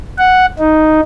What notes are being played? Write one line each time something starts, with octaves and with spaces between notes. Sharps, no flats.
F#5
D#4